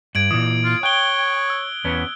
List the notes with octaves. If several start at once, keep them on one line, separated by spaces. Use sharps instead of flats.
G2 G#6 D7 F#7
A#2 E3 D#6
F4
C#5 G5 F#6 G7
E6
E2 B3 C#4